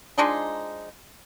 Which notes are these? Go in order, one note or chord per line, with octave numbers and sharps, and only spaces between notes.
F3 G#3 D4 D#4